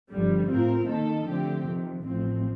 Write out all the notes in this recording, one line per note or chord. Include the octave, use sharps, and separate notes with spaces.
G1 F2 D3 G3
A2 A3 C4 F4 A#4
D#3 A#3 D#4 A4
D3 F3 A3 C4 G4
F2 C3 D#3
A1 A2 F3 C4